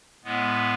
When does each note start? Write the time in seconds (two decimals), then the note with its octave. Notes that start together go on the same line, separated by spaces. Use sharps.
0.24 A2 G#3 B3